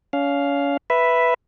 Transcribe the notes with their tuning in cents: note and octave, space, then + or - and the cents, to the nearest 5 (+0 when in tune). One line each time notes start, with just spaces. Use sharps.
C#4 +35 F5 +0
B4 +0 E5 +5